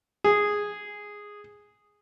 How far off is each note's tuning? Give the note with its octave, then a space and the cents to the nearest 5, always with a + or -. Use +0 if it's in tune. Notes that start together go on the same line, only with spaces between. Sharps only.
G#4 -5